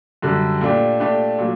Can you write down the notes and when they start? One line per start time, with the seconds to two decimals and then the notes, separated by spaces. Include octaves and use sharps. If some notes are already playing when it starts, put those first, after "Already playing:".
0.22 F#2 D3 G3
0.61 A#2 A3 D4 G4
1.00 A#2 A3 D4 G4
1.39 A#2 F#3